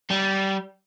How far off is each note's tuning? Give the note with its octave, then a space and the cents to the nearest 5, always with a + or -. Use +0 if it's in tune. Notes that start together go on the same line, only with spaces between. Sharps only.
G3 -20